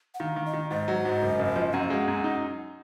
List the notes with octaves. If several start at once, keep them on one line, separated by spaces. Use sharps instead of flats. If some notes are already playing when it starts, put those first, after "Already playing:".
F#5
D#3 F5
D#3
D#5
D#3
G#2 D#5
F#3
G#2
F#1
F#1
F3
F#2 F#5
F5
G#3 F#5
F#2
D#4